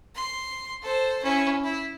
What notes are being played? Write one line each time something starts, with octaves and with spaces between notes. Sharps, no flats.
C6
A4 C5
C#4 E4
E4